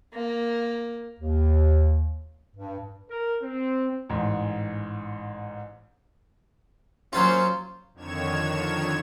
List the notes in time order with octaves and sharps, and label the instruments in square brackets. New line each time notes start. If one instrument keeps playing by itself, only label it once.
[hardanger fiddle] A#3
[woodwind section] D#2
G2
[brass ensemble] A#4
C4
[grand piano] A1 G#2
[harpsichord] F#3 F4 [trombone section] A#3 C#4 C5
[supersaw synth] F2 D3 D#3 C#5 G#6 E7